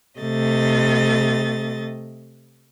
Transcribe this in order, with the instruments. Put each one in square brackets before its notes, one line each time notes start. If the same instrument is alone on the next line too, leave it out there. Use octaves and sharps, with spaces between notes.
[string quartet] C3 A3 D#5 A6